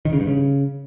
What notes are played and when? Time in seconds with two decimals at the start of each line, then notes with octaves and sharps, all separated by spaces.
0.05 D#3
0.13 C#3
0.20 G2
0.27 C#3